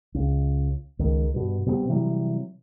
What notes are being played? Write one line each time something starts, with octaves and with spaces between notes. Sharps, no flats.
C#2
C#2 D#3
G2 B2
B2 G3 G#3 C4
C3 E3 F#3 G3